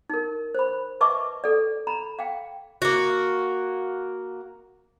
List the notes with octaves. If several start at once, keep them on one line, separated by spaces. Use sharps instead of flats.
D#4 A#4
C5 B5
B4 D#5 E5 A5 C#6 D6
A4 D5
A#5 B5
F5 G5
A#3 F#4